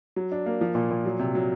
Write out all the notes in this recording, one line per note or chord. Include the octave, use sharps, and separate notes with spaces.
F#3
D4
A#3
F3
A#2
A#2
F#3
C3
F#3